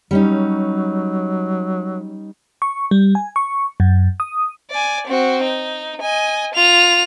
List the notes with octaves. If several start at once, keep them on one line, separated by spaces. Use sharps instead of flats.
F#3 G3 C#4 D#4
C#6
G3
G#5
C#6
F#2
D#6
D5 G#5
C4 F#4
D#4
D#5 G#5
F4 F7